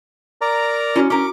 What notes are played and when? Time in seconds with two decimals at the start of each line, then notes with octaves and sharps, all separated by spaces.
0.41 A#4 D5 A#5
0.96 C#4 E4 F#4 D#6
1.10 C#4 A#4 D6